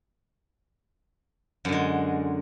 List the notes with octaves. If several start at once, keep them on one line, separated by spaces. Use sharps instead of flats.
F#2 D3 G#3